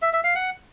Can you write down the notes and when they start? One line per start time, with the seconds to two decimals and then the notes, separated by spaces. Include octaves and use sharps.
0.02 E5
0.13 E5
0.24 F5
0.35 F#5